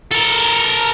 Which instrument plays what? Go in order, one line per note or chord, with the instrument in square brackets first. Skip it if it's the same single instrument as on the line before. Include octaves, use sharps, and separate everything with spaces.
[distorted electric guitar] A4 A#4